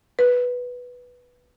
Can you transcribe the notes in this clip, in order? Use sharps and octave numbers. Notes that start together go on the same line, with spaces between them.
B4